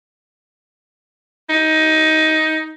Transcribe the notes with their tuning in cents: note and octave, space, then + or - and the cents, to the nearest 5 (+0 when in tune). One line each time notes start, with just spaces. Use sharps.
D#4 +15